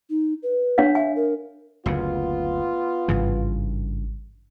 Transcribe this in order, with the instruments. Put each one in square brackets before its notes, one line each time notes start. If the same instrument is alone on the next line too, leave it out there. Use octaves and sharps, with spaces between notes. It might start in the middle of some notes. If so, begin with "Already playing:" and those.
[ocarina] D#4
B4
[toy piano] D4 C#5 F5
[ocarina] E5 [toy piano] G#5
[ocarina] A#4
[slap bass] F#1 D2 C#3 [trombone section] B3 F4
[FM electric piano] G#1 [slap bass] G2 C#3 E3